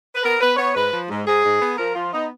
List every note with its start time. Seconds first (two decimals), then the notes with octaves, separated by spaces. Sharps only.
0.15 B4
0.23 B3 A#4
0.40 B3 B4
0.57 B3 C#5
0.74 G#2 B4
0.91 F3
1.09 G#2
1.26 G#2 G#4
1.43 G#2
1.61 B3
1.77 F3 A#4
1.95 F3 F4
2.12 B3 D#4